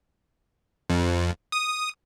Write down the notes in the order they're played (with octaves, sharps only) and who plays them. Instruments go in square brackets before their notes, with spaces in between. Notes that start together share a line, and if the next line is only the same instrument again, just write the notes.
[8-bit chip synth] F2
D#6